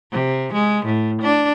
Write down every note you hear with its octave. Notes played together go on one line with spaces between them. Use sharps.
C3
G#3
A2
D4